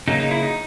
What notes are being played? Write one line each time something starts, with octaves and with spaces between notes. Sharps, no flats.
C#3 F#3 A#3 D#4
D#4
E4
D#4